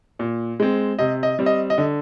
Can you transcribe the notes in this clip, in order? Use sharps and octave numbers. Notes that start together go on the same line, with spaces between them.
A#2
G#3 C4
C3 D#5
D#5
G3 C4
D#5
D#5
D3